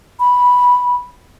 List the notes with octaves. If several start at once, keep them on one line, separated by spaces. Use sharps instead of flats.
B5